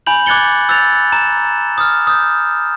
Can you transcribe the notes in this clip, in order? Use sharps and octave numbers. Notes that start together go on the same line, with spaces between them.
G#5 B5 G6 F#7
D6 F#6 G#6 A6 C#7 G7
E6 F#6 G6 A6 F7
A#5 E7
D#6 F6
D#6 G6